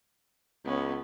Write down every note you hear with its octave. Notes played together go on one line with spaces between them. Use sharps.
C#2 B3 C#4